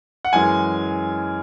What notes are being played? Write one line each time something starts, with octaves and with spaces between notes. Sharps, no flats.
F#5
F#2 E3 G#3 G#5